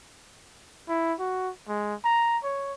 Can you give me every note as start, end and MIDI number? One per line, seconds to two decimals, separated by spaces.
0.89 1.14 64
1.19 1.51 66
1.68 1.95 56
2.05 2.38 82
2.44 2.73 73